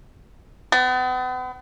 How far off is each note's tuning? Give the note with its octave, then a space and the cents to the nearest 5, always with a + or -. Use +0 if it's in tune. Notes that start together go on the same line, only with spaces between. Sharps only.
B3 +40